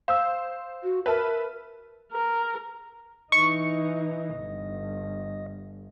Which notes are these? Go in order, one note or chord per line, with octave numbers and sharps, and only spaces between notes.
C5 F5 D#6 E6
F#4
A#4 B4 E5 A5
A#4
E3 D#4 D#5 C#6
G1